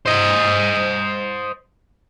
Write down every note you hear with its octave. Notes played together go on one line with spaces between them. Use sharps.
C5 D#5